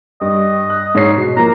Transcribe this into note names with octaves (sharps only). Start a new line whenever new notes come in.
G2 D#5
F#6
G#2 C#5 C7
B2
F3 A#3 A#5